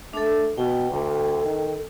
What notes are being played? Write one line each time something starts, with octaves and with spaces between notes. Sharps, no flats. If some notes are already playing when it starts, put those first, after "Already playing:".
A3 D4 A4
B2 G5
D2 A4
D#3